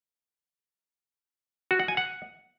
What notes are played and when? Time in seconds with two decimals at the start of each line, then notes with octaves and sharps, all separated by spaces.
1.71 F#4
1.80 F#5
1.88 G#5
1.97 F#5